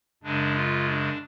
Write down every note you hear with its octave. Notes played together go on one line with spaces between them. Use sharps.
F#2 C#3 G#3 D4
F4
D4